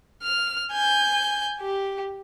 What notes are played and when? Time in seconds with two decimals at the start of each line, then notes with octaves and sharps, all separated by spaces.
0.23 F6
0.72 G#5 G6
1.61 G4